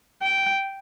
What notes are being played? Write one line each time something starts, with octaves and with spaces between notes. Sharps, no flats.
G5